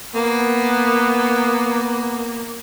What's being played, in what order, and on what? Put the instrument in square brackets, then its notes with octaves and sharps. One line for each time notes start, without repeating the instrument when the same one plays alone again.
[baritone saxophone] A#3 [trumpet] B3